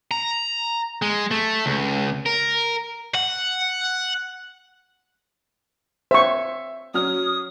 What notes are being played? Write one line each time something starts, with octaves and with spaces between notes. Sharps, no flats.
A#5
G#3
A3
C#2
A#4
F#5
C5 E5 C#6
F#3 C#4 D#6 F6